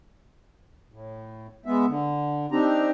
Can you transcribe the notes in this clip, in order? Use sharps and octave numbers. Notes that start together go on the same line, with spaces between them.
A2
G#3 B3 E5
D3
C4 D4 D#4 G4 A#5